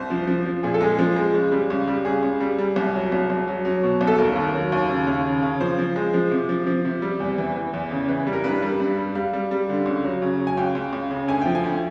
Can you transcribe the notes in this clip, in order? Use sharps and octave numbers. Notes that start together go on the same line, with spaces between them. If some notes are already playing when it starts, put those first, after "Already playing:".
Already playing: C2 C5
F3
F3
F3
A#2 G#4
A4
G#3 G#4
F3
G#3
C#2
G3
C#2
G3
C#2 G#4
C#2
G3
G3
C2
F#3
C2
C2
F#3
F#3
B2
C2
A4
D#2 A#4
D#2
F#3
D#2
C#3
D#2
C#3
C#3
F3 C5
F3
G#3
F3
C3
F3
F3
C3
G3
E2
E3
E3
E2
C#3
E3
G3
A#4
G2 B4
G3
G2
G3
G3 F5
G3
G3
D3
C#2
F#3
C#3
F#3
G#5
C#2 G5
C#2
C#2
C#3
D2 G#5
F3 G5
G#5
D2